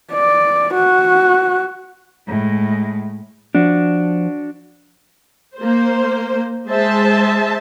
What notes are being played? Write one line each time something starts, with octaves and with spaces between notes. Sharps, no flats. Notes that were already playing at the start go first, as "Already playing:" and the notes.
D5
F#4
A2 G#3
F3 D4 F#4
A#3 C5
G#3 C5 E5 A5